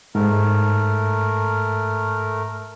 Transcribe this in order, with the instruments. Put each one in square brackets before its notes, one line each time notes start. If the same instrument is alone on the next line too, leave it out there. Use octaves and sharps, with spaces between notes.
[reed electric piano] G#2 [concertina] A3 A#4